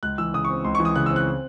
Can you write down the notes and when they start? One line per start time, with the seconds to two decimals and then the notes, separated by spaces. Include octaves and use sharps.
0.03 C#2 F#6
0.18 E3 E6
0.34 C#3 D#6
0.44 C#6
0.49 C4
0.64 C#2 C6
0.75 C#6
0.80 E3
0.85 D#6
0.96 C#3 F#6
1.06 E6
1.11 C4
1.16 F#6